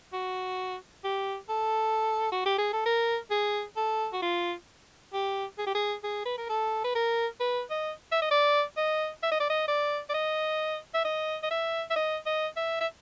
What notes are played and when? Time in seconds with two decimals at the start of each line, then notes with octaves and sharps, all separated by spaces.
0.13 F#4
1.04 G4
1.49 A4
2.32 F#4
2.46 G4
2.58 G#4
2.73 A4
2.86 A#4
3.31 G#4
3.76 A4
4.13 F#4
4.22 F4
5.13 G4
5.58 G#4
5.67 G4
5.75 G#4
6.04 G#4
6.25 B4
6.38 A#4
6.49 A4
6.85 B4
6.95 A#4
7.40 B4
7.70 D#5
8.12 E5
8.22 D#5
8.31 D5
8.77 D#5
9.23 E5
9.32 D#5
9.40 D5
9.50 D#5
9.68 D5
10.10 D5
10.14 D#5
10.94 E5
11.05 D#5
11.43 D#5
11.51 E5
11.90 E5
11.96 D#5
12.26 D#5
12.57 E5
12.80 E5